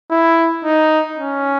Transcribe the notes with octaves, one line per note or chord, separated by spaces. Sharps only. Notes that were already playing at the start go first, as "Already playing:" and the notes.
E4
D#4
C#4